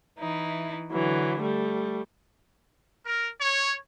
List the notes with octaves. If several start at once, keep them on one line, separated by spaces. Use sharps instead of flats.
E3 D#4 E4
D3 E3 F#3
G3 A3
A#4
C#5